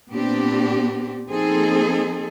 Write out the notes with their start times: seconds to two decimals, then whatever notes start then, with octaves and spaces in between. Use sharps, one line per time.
0.11 A#2 B3 C4 D4 G4
1.29 F3 A#3 C4 D#4 G#4 A4